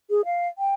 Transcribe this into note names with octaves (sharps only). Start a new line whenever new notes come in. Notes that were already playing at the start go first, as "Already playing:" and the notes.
G#4
F5
G5